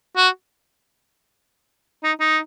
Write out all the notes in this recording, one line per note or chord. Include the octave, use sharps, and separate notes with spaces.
F#4
D#4
D#4